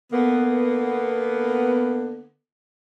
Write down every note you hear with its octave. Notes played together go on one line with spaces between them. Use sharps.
D3 A#3 B3